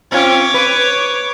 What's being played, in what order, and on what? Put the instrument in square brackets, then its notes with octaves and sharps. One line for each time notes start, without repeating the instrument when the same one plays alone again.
[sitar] C4 C#4 F4 [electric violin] C#5 D6
[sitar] B4